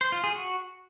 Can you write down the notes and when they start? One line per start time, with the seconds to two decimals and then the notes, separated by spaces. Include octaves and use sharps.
0.01 C5
0.12 F4
0.24 G#4
0.35 F#4